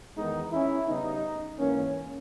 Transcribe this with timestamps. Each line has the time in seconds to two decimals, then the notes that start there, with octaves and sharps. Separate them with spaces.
0.17 E2 D#3 G#3 B3 D#4
0.52 C#4 E4
0.88 C#3 G3 B3 D#4
1.58 G#2 E3 A#3 C#4